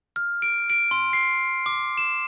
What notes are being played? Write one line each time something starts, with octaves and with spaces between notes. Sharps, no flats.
F6
D7
D7
C6
C7
D6
E7